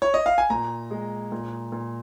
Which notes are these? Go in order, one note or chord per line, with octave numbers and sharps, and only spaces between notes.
C#5
D#5
F5
G#5
A#2 A#5
G#3
A#2
A#2